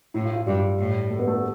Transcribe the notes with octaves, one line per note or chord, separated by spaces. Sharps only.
A2 E4
F4
F4
G2 G3
A2
A3
B3
A3
B3